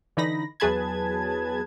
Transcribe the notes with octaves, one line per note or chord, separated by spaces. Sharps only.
D3 E3 D#4 B5 A#6
E2 F#3 G#4 B4 A5 G#6